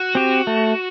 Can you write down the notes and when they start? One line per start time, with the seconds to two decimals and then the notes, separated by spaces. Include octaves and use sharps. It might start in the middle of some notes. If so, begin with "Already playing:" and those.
Already playing: F#4
0.15 C4 G4
0.47 A3